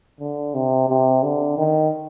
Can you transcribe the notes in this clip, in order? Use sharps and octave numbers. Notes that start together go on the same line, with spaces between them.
D3
C3
C3
D3
D#3